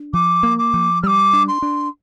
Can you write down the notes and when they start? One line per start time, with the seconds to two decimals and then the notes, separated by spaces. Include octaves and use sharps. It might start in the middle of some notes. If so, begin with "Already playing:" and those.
Already playing: D4
0.13 F3 D6
0.43 A#3
0.58 D6
0.73 F3
1.03 G3 D6 F6
1.33 D4
1.48 C6
1.62 D4